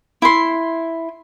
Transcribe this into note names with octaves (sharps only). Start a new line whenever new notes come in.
E4 C6